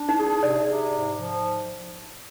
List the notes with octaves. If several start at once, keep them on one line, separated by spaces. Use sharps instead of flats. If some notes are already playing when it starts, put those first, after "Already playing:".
Already playing: D4
D#4
G#4
D#4
C3 D5
C3
G#2
F3